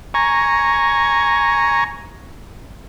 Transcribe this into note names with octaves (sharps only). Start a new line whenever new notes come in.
G#5 A#5 C#6